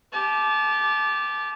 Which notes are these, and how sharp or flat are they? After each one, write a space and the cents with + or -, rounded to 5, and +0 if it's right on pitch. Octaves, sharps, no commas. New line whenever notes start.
G4 +0 A5 -30